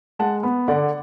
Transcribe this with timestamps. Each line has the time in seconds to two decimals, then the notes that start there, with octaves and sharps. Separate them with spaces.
0.19 G#3 F#5 A5
0.43 B3
0.68 D3 D5 F#5